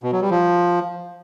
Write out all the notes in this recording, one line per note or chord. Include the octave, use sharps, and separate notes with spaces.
B2
F#3
G3
F3